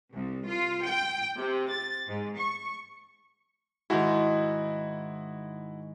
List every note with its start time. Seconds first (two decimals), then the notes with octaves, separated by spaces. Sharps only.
0.14 C2
0.47 F4
0.87 G5
1.39 C3
1.72 A6
2.07 G#2
2.37 C#6
3.90 G#2 D#3 E4 F#4